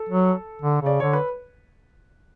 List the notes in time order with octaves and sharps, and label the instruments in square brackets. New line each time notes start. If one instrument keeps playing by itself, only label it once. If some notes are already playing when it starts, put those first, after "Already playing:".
Already playing: [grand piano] A4
[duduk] F#3
D3
[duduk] C#3 [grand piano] D5
[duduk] D3 [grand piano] C#5
[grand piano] B4